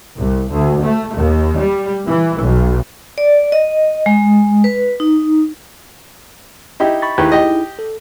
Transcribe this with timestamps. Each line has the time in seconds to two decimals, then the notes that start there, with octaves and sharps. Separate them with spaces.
0.18 C2
0.50 D2
0.83 A3
1.14 D#2
1.59 G3
2.05 E3
2.38 B1
3.18 D5
3.52 D#5
4.06 G#3
4.64 B4
5.00 D#4
6.80 D#4 E4 G4
7.02 B5 C#6 A6
7.18 D#2 D#4 E4 G4 G#4 B4
7.32 G4 D#5
7.79 A4